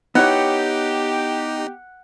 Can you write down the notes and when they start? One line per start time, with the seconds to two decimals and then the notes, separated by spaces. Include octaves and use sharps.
0.15 B3 D#4 E4 G4 C#5 F#5